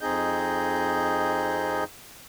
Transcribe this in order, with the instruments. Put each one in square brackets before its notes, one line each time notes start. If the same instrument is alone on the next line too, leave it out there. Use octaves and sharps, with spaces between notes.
[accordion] F2 C4 D#4 G#4 D#5 G6